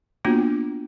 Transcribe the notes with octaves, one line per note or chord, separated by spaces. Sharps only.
A#3 B3 D4 F4 F#4